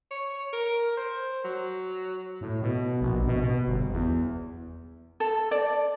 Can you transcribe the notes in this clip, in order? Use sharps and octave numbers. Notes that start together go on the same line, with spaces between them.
C#5
A#4
C5
F#3
A2
B2
A#1
B2
B2
G1
E2
A4
D5